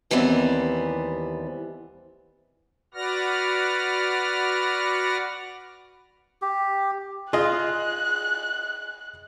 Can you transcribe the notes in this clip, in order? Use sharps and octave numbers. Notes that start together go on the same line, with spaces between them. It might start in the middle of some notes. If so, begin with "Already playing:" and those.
D#2 E3 G3 B3 C4
F#4 B4 D5 F#5 F6 A#6
G4
F4 G#4 D#5 F#6